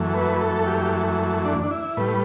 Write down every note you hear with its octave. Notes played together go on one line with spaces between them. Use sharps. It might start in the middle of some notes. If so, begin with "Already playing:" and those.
Already playing: F#2 E3 A3
B4
A4
G4
D4
D4
E4
A2 G3 B4